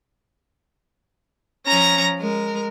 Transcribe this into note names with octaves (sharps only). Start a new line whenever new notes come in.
F3 C#4 A#5 A#6
G#3 A#4